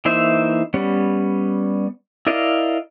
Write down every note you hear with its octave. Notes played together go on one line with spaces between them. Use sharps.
E3 A#3 D#4 C5 E5
G3 B3 C#4
E4 A#4 D5 D#5 F5